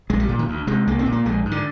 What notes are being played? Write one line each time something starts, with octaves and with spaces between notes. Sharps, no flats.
A#1 G#3
G3
A#2
D#3
D2
C3 G#3
C2 A#3
C4
A#2
A#3
A#1 G#3
G#2
D3